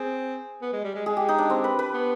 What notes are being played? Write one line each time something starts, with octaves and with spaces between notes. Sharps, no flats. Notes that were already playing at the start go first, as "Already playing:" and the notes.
Already playing: C4 G#4
B3
G#3
G3
G#3
G#3 G#4
G4
D#4
D4
C4
B4
B4
B3